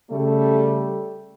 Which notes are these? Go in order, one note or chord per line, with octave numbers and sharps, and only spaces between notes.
C#3 G3 A3